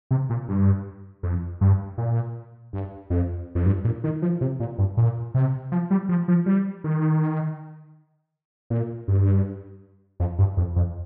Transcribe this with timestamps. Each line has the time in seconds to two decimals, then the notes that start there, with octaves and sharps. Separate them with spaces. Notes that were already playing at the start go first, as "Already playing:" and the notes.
0.11 C3
0.30 A#2
0.48 G2
1.23 F2
1.61 G2
1.98 A#2
2.73 G2
3.10 F2
3.55 F2
3.66 G2
3.85 A#2
4.04 D#3
4.22 F3
4.41 C3
4.60 A#2
4.78 G2
4.97 A#2
5.34 C3
5.72 F3
5.91 G3
6.09 F3
6.28 F3
6.46 G3
6.84 D#3
8.70 A#2
9.08 G2
10.20 F2
10.39 G2
10.57 F2
10.76 F2